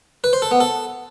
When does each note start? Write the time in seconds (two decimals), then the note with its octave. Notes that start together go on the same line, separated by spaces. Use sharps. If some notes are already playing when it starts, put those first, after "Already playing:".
0.24 B4
0.33 C5
0.42 A4
0.51 B3
0.60 A4